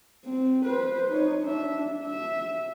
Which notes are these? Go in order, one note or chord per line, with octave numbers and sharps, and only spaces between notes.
C4
B4 C5
D#4 C#5
D4 E5
E5